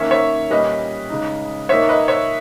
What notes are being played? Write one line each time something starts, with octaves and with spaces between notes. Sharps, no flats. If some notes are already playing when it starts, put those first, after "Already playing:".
Already playing: D#3 A#3 C#4 C#5 E5
C#5 E5
A#2 G3 C#4 B4 D#5
C#3 G#3 D#4
A#2 A#3 D#4 C#5 E5
B4 D#5
C#5 E5